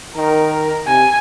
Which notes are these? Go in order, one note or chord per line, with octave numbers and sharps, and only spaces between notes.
D#3 A#4
C3 G#5